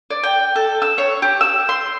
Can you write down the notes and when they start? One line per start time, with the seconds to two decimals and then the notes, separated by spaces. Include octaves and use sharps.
0.10 D5
0.23 G5
0.56 A4
0.82 E6
0.98 C#5
1.22 G4
1.41 E6
1.69 C6